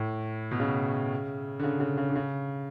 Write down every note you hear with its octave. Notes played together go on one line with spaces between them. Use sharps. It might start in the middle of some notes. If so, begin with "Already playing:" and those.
Already playing: A2
B2
C#3
D3
C#3
C#3
C#3
D3
C#3